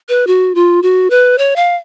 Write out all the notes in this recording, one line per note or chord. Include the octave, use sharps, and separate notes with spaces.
B4
F#4
F4
F#4
B4
C#5
F5